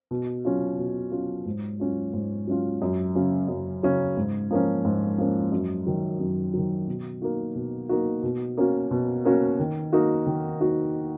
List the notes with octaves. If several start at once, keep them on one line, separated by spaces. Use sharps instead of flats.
B2
F#3 C#4 F4
B2
F#3 C#4 F4
G#2
F#3 C#4 F4
G#2
F#3 C#4 F4
F#2
C#3 F#3 C#4
F#2
C#3 F#3 C#4
G#2
F3 A#3 C#4
G#2
F3 A#3 C#4
F#2
D#3 F#3
F#2
D#3 F#3
B2
A#3 D#4 F#4
B2
A#3 D#4 F#4
B2
A#3 C#4 F#4
B2
A#3 C#4 F#4
D#3
A#3 D#4 F#4
D#3
A#3 D#4 F#4